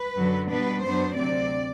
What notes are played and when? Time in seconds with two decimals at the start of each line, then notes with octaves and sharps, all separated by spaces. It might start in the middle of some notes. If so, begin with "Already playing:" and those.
Already playing: B4
0.17 F#2 D3 F#3
0.50 B2 G3 B3 D4 B4
0.84 F#2 F#3 B3 D4 C5
1.16 D2 C3 F#3 C4 D5